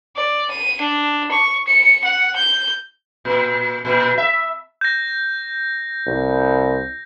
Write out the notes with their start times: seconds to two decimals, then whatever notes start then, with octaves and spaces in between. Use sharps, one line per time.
0.16 D5
0.51 D#7
0.81 D4
1.31 C#6
1.67 C#7
2.04 F#5
2.36 G6
3.25 A#2
3.85 A#2
4.18 E5
4.81 G6 A#6
6.07 C2